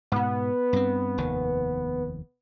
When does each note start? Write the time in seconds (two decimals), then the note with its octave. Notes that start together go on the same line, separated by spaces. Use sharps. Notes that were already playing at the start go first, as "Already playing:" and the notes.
0.12 G#2 B2 B3
0.73 G2 C4
1.18 F1 D#2 D#3